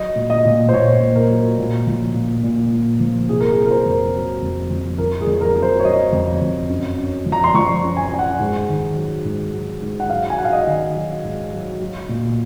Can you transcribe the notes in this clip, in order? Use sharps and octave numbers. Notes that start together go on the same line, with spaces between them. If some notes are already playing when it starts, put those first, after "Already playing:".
Already playing: F#3 D#5
A#2
D#5
A#2
C5
A#2 C#5
A#2
A#4
F#3
A#2
F3
A#2
A#2
A#2
F3
C3 G#4
A#4
G#4
F#3
A#4
C5
F2
F#3
F2
F2
F2 A#4
G#4
F2
A#4
F#3
C5
C#5
F#3 D#5
F2
F2
F#2
F#2
F3
A#5
C6
F3 C#6
F#2
G#5
F#2 G#5
F#5
G#2
D#3
F#3
G#2
F#3
G#2
F#5
F#3 F5
G#5
F#3 F#5
F5
D#5
D#3
F#3
G#2
F#3
F#3
A#2